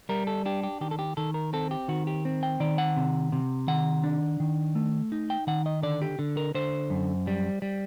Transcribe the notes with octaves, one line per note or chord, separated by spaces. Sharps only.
G3 A#4
A4
D4 G4
G4
D#3 G4
A4
G4
D#3 A4
A#4
C4 A4
G4
D#3 F#4
G4
C4
G5
D#3 D5
F#5
C3
C3
D#3 F#5
D4
D#3
A3
D#4
G5
D#3 F#5
D#5
D3 D5
G4
D3
A#4
D3 C5
F#2
G3
G3